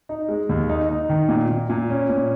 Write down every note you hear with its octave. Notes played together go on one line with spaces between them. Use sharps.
D#4
G#3
D#2
D#4
D#4
D#3
A#2
A#2
A#2
C#4
A#2